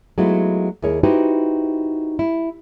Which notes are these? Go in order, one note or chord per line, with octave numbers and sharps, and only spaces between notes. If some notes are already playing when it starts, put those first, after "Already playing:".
F#3 G#3 A3 B3 E4 F4
D#2 E4 G#4 A#4 C#5
D#4 E4 F#4 G4 B4 C5
E4